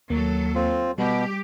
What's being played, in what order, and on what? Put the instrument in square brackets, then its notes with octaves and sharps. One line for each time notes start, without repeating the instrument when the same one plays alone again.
[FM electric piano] D#2 A#3 [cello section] F#3 A4
[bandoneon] C4 F4
[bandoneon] B2 [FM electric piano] G3 [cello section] G4